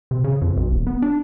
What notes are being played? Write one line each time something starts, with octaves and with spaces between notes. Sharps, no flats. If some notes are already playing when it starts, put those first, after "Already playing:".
C3
C#3
F2
B1
D#1
B3
D4